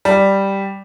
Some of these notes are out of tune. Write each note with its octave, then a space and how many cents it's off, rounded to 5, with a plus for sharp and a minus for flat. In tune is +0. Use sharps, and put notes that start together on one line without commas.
G3 +0